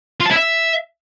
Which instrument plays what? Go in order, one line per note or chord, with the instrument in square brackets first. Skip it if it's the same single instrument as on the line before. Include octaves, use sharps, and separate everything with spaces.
[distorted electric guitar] F4
A5
E4
E5